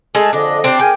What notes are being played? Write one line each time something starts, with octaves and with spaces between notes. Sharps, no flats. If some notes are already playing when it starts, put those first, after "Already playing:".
G#3 A3 G#4 A4
F2 D3 D4 D#5
C4 D4 G4
G#4 A#4 G5 G#5